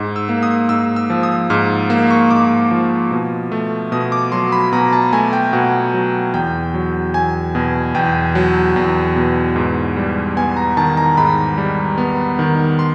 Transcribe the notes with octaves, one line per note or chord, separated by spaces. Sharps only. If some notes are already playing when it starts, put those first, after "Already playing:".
Already playing: G#2
E6
A#3
D#6
G#2 E6
E6
F3
D#6
G#2 F6
A#3
C#6
G#2 D6
F3
B2
A3
B2 D#6
D6
F#3 C6
B5
B2 A#5
A5
A3 G#5
G5
B2 F#5
F#3
E2 G5
F#3
E2 G#5
B2
E2 G5
F#3
E2
B2
G#2
G3
B3 G#5
A#5
D#3 A5
A#5
G#2 B5
G3
B3
D#3
C6